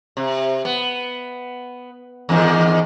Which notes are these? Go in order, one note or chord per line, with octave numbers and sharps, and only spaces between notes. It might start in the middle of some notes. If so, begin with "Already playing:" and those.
C3
B3
E2 G#2 D#3